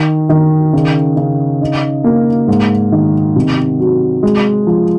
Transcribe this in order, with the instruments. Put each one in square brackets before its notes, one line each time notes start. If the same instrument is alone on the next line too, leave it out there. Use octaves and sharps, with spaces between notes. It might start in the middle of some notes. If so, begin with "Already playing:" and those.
Already playing: [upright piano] D#3
D#3
C#3
C#3
D#4
A#3
G#2
D#3
C3
F#3
G#3
F3